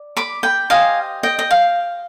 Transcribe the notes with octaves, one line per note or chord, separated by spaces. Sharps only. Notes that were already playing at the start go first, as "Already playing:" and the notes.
Already playing: D5
B5 D6
G5 B5
G4 C5 D#5 F5 G#5
D#5 G5
D#5
F5